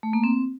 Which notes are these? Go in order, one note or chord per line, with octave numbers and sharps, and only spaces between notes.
A3
A#3
C4